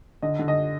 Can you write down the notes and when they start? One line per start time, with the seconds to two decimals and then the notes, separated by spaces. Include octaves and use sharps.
0.22 D3 D#5
0.39 D3
0.48 D#5